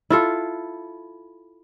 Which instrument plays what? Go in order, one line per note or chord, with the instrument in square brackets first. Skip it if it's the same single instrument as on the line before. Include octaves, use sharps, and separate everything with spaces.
[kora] E4 F4 A4